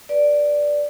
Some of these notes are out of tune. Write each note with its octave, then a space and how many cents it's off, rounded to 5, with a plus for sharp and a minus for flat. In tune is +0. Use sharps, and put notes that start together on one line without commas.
B4 -20 D5 +0